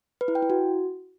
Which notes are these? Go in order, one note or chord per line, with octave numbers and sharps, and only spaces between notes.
B4
E4
G5
E4
F#4